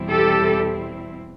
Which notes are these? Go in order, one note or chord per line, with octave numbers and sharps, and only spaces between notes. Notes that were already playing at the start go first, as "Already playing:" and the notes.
Already playing: E2 B2 G3 C4 E4
G4 A4